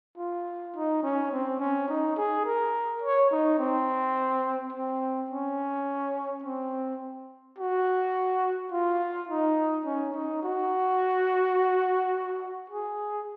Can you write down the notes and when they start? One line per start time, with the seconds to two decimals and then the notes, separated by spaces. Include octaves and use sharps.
0.17 F4
0.75 D#4
1.03 C#4
1.32 C4
1.60 C#4
1.88 D#4
2.17 G#4
2.45 A#4
3.02 C#5
3.31 D#4
3.59 C4
4.73 C4
5.31 C#4
6.44 C4
7.59 F#4
8.71 F4
9.29 D#4
9.86 C#4
10.14 D#4
10.43 F#4
12.70 G#4